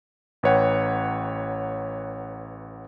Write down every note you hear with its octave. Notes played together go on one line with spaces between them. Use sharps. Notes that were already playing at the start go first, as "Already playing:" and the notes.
A1 B4 C#5 F#5 G5